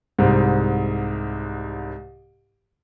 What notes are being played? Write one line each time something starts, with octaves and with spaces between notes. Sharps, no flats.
C2 G#2